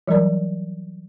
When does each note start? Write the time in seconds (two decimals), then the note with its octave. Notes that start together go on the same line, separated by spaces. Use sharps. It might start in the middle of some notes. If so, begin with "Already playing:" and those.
0.07 E3 F#3 G3 A#4 D5